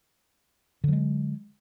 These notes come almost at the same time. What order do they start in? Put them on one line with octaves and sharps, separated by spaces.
D3 F#3 G#3